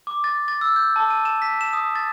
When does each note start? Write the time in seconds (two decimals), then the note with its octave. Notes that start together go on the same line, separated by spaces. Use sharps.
0.07 D6
0.24 A6
0.48 A6
0.61 E6
0.76 G6
0.96 A5
1.10 D#7
1.25 E7
1.42 B6
1.61 E7
1.73 D#6
1.95 A6